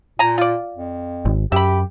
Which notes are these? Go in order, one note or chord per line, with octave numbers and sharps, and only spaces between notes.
A#2 G#5 A#5
F4 D5
F2
G#1
F#2 G4 E5 B5